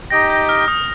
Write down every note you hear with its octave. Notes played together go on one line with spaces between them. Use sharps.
D#4 G4 D#5 G5 A#6
G6
F6
D#6